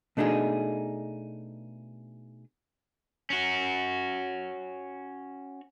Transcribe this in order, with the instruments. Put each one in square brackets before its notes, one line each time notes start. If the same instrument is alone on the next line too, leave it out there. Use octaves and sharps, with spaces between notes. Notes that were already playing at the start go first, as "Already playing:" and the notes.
[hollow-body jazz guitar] B2 A3 D4 D#4 G#4
[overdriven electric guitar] C#4 F#4